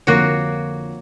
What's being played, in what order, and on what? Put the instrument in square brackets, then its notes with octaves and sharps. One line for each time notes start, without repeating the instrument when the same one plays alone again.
[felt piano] F2 D3 [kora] A#3 F#4 C#5